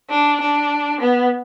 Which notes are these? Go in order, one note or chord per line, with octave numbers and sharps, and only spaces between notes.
D4
D4
B3